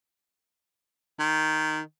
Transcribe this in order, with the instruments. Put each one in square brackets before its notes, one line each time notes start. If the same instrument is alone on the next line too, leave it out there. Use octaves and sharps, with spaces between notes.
[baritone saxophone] D#3